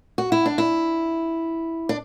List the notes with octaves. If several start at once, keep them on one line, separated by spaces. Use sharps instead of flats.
F#4
E4
D4
E4
D4